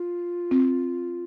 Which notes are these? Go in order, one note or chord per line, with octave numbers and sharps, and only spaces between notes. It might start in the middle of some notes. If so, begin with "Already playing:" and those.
Already playing: F4
C4